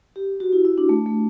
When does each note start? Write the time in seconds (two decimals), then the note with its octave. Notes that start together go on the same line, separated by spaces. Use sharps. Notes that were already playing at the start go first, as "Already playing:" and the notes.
0.16 G4
0.40 F#4
0.53 E4
0.65 E4
0.78 D4
0.89 A3
1.06 A3